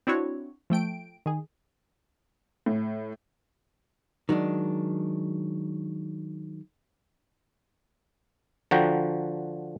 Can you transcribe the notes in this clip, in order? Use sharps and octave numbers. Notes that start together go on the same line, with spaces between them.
C4 D4 E4 F#4 C#5
F3 A3 G5 D7
D#3 G#4
A2
D#3 F#3 G#3 D4
D3 F3 F#4 F#5 G5 A#5